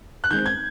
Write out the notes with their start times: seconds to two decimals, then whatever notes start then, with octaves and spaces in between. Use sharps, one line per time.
0.24 F#6
0.31 D#3 G#3 C4 G6
0.46 G#6